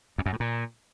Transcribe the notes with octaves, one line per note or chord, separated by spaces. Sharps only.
F2
F#2
A2
A#2